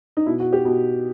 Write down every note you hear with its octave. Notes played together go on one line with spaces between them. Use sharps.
D#4
B2 E4
F#4
G4
B2